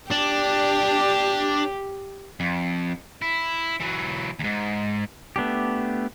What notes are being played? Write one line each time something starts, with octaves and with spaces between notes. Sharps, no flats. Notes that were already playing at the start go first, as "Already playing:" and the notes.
D4 G4
F2
E4
E3 F#3
D#2 G#2
A3 B3 D4 G4